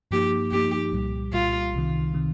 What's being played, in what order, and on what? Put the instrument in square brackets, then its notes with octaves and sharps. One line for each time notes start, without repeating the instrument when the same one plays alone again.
[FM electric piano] G2 F3 A#3 D#4 [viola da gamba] G4
[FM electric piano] G2 F3 A#3 D#4 [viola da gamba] G4
[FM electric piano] C2 A#2 G3
[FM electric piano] C2 A#2 G3 [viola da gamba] F4
[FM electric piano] C2 C3 D#3
C3 D#3